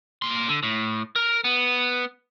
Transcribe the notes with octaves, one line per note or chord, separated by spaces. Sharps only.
A#3 C6
D3
A2
A#4
B3